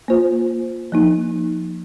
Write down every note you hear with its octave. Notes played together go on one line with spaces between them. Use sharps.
A#3 F4 C5
F3 A#3 D#4